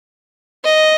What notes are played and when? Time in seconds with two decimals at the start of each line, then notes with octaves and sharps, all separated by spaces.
0.65 D#5